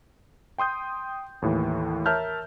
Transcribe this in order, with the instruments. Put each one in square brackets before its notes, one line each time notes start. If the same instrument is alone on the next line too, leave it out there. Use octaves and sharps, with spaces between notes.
[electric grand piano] G5 C6 D#6 G6
D#2 A2 E3
A#4 C#5 E5 A5 F6 G6